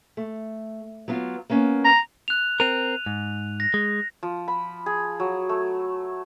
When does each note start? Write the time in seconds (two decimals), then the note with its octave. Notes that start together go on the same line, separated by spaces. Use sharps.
0.17 A3
1.08 F#3 B3 F4
1.50 A#3 B3 C#4
1.85 A#5
2.28 F#6 F7
2.60 C4 A#4 D#7 F7
3.06 G#2
3.60 A#6
3.74 G#3
4.23 F3
4.48 B5
4.86 G#4
5.20 F#3
5.49 A3